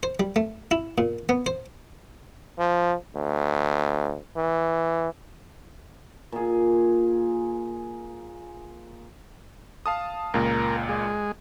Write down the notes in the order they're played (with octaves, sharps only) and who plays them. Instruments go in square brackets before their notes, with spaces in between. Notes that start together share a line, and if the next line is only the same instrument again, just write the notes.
[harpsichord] C5
G3
A3
E4
A#2
B3
C5
[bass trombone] F3
D2
E3
[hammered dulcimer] A#2 G#4
[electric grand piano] F5 A5 D#6
[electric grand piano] C#2 A#2 [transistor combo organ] A#4
[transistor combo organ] G#3